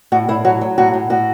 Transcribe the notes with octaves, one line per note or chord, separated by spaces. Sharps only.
A2 F#4
A2 E4
F#3 F#4
F#3
A2 F#4
A2
A2 F#4